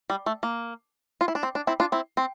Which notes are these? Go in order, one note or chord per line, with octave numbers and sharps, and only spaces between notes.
G3
A3
A#3
F4
E4
D4
C4
D4
C4 E4
D4 F4
C4 E4
C4